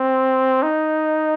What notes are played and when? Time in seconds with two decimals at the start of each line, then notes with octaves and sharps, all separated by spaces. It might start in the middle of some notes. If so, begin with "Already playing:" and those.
Already playing: C4
0.62 D#4